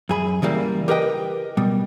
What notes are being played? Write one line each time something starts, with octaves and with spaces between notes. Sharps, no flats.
F#2 G#4 B5
C#3 E3 G3 A#3
G4 A#4 B4 D#5 G5
B2 G3